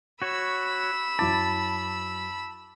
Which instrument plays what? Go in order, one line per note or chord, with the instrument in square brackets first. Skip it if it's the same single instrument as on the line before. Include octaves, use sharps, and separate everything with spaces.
[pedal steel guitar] F#4 C#5 [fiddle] B5 E6
[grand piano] F#2 E4 D6 [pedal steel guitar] A5